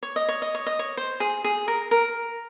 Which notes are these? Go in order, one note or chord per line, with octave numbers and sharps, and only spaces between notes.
C#5
D#5
C#5
D#5
C#5
D#5
C#5
C5
G#4
G#4
A#4
A#4